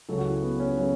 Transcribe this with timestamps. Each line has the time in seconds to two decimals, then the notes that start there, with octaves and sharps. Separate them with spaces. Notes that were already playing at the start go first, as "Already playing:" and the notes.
0.09 C#2 C#3 F#3 A4
0.18 F#4
0.25 E4
0.42 B3
0.60 C#4
0.77 C#3 F#3